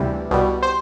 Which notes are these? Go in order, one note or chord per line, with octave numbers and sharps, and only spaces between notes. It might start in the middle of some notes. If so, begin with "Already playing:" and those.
Already playing: D2 C3 E3 G3
C2 B2 G3
C5